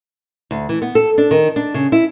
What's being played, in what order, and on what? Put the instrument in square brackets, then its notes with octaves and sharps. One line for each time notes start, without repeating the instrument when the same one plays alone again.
[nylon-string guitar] D2
E3
B3
A4
D4
D#3
D4
C#3
E4